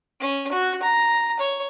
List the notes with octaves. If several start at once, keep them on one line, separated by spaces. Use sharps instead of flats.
C#4
F#4
A#5
C#5